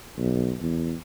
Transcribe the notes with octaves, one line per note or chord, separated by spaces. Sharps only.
B1
E2